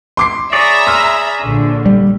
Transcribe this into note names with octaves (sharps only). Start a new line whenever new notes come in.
C6 D6 C7
G#4 C#5 D5 E5 A#5 B5
C6 E6 F6
A#1 D3
G3